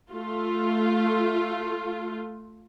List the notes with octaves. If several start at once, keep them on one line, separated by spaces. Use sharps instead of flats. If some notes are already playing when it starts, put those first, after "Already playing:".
A3 F4